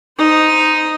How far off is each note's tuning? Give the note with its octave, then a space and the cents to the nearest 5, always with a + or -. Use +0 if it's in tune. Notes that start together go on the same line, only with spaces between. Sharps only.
D#4 +0 C5 -20